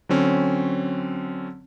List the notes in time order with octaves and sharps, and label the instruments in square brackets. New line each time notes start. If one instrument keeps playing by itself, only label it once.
[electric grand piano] D3 F#3 C4 C#4